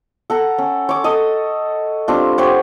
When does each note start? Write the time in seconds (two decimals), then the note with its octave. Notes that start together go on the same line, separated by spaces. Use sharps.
0.30 A4 F#5 A#5
0.58 C#4
0.89 C#5 D6
1.04 A4 D#5 D#6
2.08 G3 C4 D4 F4
2.38 G4 C5 C#5 F#5